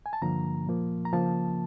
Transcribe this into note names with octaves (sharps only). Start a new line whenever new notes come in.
G#5
A5
G2 D3 F3 A#3 A#5
A#2 F3 A#3
A#5
C#3 F3 A#3 A5